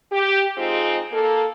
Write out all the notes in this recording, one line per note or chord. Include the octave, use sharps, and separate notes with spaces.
G4
G#3 C4 D#4 F4 G#4
A#3 A4